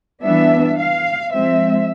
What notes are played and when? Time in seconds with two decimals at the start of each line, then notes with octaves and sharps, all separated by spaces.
0.23 E3 G3 B3 D4 E5
0.78 F5
1.32 F3 G#3 C4 E5